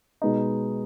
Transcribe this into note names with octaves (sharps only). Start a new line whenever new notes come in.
B2 G#3 B3 D#4